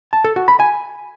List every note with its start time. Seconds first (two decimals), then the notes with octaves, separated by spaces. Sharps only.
0.13 A5
0.24 A4
0.36 F#4
0.48 B5
0.60 G#5